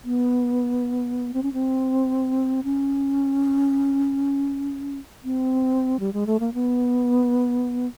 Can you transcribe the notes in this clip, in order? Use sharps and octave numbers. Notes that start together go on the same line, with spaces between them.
B3
C4
C#4
C4
C#4
C4
G3
G#3
A3
A#3
B3